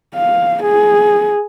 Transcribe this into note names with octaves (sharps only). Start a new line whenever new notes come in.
F5
G#4